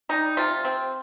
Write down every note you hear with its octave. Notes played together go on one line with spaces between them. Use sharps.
G3 D#4
C3 F4
C4